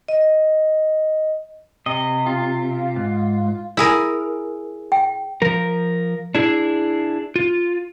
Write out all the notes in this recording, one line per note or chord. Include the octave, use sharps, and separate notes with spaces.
D#5
C3 D#5
F4
G#2
E4 G#4 A#4
G5
F3 A#4
D4 E4 G#4
F4